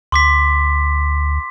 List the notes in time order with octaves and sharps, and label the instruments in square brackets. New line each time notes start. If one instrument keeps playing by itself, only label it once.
[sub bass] D2 [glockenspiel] C6 D6 B6